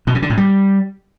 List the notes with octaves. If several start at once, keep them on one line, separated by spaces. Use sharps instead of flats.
B2
C#3
D3
A2
G3